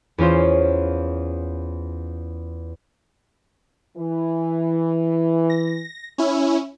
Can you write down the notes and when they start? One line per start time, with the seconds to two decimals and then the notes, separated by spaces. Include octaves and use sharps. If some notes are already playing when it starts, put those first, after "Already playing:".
0.18 E2 C#4 F4 C5
3.96 E3
5.50 A#6
6.18 C#4 E4